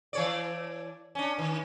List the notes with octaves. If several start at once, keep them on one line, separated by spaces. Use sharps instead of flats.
E3 C#5 D5
C#4 D4
D#3